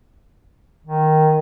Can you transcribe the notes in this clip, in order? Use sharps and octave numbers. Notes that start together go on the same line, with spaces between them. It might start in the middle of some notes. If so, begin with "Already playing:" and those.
D#3